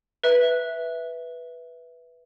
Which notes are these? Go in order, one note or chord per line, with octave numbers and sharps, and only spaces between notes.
B4 E5